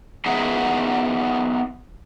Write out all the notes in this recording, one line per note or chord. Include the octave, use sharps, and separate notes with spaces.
B3 D#4 G#4 E5 F#5